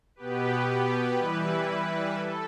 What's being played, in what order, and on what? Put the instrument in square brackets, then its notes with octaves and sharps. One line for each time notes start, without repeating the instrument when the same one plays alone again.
[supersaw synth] B2 B3 G4 B4
E3 G3 E4 B4
A4